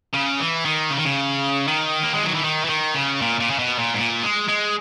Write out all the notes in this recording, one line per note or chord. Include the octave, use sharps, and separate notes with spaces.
C#3
E3
D#3
C#3
D#3
C#3
D#3
A#3
G#3
F#3
E3
D#3
E3
D#3
C#3
A#2
A#2
C#3
B2
A#2
G#2
A#2
G#3
G#3